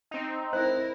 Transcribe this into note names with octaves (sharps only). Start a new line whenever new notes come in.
C4 D#4
E4 A#4 C5